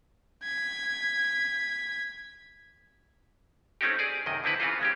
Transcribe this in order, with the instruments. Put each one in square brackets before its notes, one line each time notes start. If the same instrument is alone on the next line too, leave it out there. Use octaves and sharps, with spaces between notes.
[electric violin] G#6 B6
[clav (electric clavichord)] A3 C4 C#4 D#4 F#4 G4
G#4 D5
F#2 C3 D#3 D#5
D3 C4 E4 B4
C#3 E3 C4 F4 F#4 C5
G#3 C#4 G4